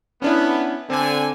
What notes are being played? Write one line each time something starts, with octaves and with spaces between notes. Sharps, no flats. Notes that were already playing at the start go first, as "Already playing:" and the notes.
B3 C#4 D4 E4
D3 C4 G#5